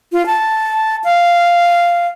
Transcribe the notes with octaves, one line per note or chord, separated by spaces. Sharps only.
F4
A5
F5